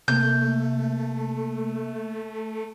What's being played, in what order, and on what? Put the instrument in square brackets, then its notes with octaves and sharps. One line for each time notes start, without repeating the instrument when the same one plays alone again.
[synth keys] C3 A#3 [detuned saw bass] A3 [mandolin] G6